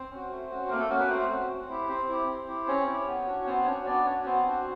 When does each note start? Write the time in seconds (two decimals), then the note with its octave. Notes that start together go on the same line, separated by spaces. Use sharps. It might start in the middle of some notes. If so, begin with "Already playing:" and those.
Already playing: C4 C5
0.11 C#4 F#4
0.31 A3
0.50 C#4 F#4
0.69 A3 A#3 A#4
0.79 A4
0.89 A#3 C#4 F#4 A#4
0.99 B3 B4
1.09 A3 C4 C5
1.29 C#4 F#4
1.49 C4
1.69 E4 G4
1.88 C4 C5
2.09 E4 G4
2.28 C4
2.48 E4 G4
2.67 C4 C#4 C#5
2.87 E4 G4
3.07 B3
3.27 D4 F#4
3.46 B3 C4 C5
3.66 C#4 D4 F#4 C#5
3.86 B3 D4 D5
4.05 C#4 D4 F#4 C#5
4.26 B3 C4 C5
4.46 D4 F#4